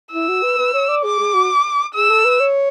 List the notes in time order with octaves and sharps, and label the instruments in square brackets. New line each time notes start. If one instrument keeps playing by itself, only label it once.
[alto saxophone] E4 [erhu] E6
[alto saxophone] F#4
B4
B4
C#5
D5
[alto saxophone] G#4 [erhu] D6
[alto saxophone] G#4
F#4
[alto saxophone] G#4 [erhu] E6
[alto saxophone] A4
B4
C#5